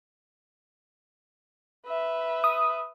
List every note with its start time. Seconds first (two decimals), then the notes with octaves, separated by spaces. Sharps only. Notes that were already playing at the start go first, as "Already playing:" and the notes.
1.86 B4 E5
2.44 D#6